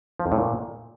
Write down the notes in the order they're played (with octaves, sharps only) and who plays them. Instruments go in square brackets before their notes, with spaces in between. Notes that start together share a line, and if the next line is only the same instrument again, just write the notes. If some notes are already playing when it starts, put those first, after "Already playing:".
[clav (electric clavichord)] F3
F2
A2
A#2